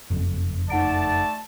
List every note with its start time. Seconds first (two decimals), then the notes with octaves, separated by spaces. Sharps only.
0.11 F#1 F2
0.70 A3 D#4 D5 F#5 A5 D7